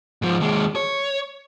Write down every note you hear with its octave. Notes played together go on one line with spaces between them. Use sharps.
G#2 F3
D#2 G#3
C#5